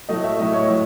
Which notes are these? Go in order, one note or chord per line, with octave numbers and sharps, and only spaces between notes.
A2 F#3 A3 D#5
E5
A2 F#3 A3 D#5
C#5
A2 F#3